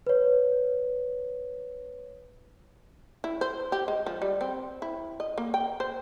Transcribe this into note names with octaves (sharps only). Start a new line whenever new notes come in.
B4 C#5
E4
C5
G4
G#3
F3
G3
C4
E4
D#5
A#3
G5
C5